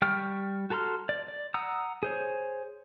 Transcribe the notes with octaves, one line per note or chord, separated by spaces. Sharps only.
G3 G5 C#6 F6
F#4 A4 A#5 C6 F6
D5
D5
F#5 A#5 D#6 E6
G#4 C5 C#5